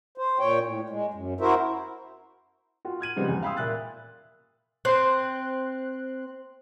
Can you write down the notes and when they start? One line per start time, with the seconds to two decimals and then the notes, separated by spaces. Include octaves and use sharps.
0.18 C5
0.39 A#2 C#5 G5
0.64 A2
0.90 G#3
1.14 F#2
1.41 E4 F#4 A#4 C5 E5
2.85 F4 F#4
3.01 F6 G#6 D#7 F#7
3.16 C#3 F3 G3 G#3 B3 C4
3.29 E2
3.43 F5 G5 B5 C6 D#6 E6
3.57 A#2 E5 F#6 A6
4.85 C4 C5 C6 F#6